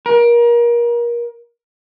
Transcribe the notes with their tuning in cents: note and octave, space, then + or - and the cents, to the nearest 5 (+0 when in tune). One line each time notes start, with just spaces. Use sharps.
A#4 +30